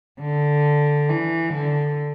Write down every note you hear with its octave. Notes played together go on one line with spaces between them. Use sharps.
D3
E3
D3